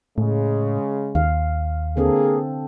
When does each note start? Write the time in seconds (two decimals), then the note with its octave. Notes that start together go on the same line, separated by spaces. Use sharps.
0.18 A2 C#3 G#3
1.15 D#2 F5
1.97 D3 A#3 C4 G#4 A4